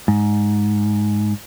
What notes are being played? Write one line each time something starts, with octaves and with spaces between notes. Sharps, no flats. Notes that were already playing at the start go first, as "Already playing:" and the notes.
G#2